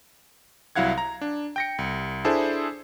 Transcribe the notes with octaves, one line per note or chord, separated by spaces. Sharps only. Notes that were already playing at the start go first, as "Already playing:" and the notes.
C2 F#3 E4 F5 F#5 G#6
A#5
D4
G5 A#6 C#7
C2
D4 E4 G#4 A4 C5